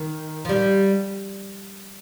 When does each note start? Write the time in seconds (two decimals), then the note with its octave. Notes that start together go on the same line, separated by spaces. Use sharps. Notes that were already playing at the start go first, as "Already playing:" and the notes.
Already playing: D#3
0.45 F3
0.49 G3